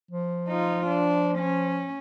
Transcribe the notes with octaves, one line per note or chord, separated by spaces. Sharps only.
F3
D#4 F4
D4
C#4